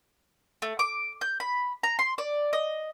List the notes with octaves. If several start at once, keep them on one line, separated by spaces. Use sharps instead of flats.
A3
D6
G6
B5
A#5
C6
D5
D#5